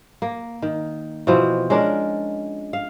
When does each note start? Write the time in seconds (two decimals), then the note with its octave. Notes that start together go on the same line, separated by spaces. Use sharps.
0.22 A#3
0.62 D#3
1.27 B2 E3 F3 C4
1.70 G#3 C#4 D4 A#4
2.73 F5